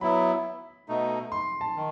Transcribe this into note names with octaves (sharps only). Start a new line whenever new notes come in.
F#3 B3 E4 B5
B2 A3 D#4
C6
A5
D#3